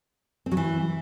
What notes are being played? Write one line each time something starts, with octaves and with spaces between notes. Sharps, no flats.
C4
F#3
E3